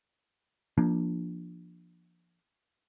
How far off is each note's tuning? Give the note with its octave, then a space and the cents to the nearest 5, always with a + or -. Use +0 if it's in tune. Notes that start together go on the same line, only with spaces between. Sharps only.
F3 -15 A#3 +20 D4 +0